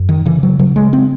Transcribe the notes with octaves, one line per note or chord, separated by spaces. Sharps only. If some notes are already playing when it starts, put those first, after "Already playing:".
Already playing: F#2
D#3
C#3 E3
F#3
C#3 F#3
G#3
C4